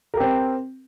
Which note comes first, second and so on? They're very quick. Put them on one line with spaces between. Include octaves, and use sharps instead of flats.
A#4 G4 C4